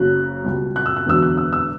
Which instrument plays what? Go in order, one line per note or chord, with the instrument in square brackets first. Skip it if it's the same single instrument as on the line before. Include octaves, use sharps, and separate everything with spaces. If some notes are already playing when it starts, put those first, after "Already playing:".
Already playing: [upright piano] F#1 F#2 C#3 F#3 F#6
C#2 B2 G3
F#6
E6
F#6
E1 E2 D3 F#3 E6
F#6
E6
E6